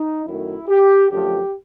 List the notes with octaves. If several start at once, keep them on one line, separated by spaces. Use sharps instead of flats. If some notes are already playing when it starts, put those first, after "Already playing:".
Already playing: D#4
F#2 D#3 F#3 A3 E4
G4
F#2 D3 F3 A3 G4